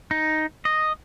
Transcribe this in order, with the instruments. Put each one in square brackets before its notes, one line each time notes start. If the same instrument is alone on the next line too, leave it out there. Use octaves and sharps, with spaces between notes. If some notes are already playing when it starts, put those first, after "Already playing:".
[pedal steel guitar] D#4
D#5